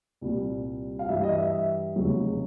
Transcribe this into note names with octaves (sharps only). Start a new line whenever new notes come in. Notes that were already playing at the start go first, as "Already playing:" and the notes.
C2 A#2 G3
F5
G2 E3 G3 E5
D#5
E5
F1 E2 C#3 F#3